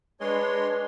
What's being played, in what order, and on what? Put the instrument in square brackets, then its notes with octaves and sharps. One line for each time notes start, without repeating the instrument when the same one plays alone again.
[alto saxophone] G#3 [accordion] D4 C#5 C6 [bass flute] B4